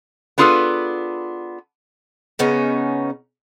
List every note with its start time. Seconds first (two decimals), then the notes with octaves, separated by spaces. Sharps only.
0.38 B3 D4 F4 G#4 A4 B4
2.39 C#3 B3 C#4 D#4